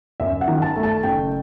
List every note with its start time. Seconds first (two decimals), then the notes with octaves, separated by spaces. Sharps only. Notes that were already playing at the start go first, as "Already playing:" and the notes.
0.20 F#2 E5
0.41 F#5
0.48 D#3
0.62 A5
0.76 A3
0.83 A5
1.03 F#1 G5